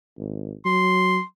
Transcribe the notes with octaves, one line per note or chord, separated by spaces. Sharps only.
G#1
F#3 C6